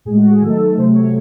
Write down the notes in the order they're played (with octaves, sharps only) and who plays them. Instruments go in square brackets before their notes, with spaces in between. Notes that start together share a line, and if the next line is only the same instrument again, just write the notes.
[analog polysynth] A2 G#4
G#3
F#4
G#4
D#3 F#3 A3 A4
C3 F#3 A3 C5
C#5